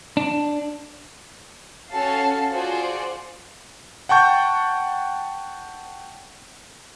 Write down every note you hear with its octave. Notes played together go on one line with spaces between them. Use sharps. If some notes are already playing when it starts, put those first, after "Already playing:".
D4
C#4 F#4 A4 F5 A5
F4 F#4 G#4 C5 D5
F#5 G5 A5 C#6 G6